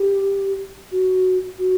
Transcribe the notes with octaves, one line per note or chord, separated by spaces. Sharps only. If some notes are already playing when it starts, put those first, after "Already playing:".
Already playing: G4
F#4
F#4